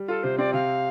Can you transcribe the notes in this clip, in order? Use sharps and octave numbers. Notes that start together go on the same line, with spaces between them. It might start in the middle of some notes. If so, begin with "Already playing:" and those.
Already playing: G3
F4 A4
C3 C5
C4 D5
C3 F5